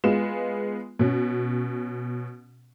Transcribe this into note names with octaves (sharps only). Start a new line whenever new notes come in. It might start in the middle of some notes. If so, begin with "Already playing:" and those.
G#3 B3 F4 E7
B2 C#4